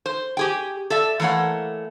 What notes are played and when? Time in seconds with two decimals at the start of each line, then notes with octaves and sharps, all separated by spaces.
0.06 C5
0.37 G4 G#4 G5
0.90 A4 D5 E5
1.20 E3 A3 A#3 C#5 F#5